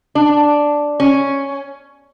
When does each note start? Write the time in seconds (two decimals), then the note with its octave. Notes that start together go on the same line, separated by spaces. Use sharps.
0.15 D4
1.00 C#4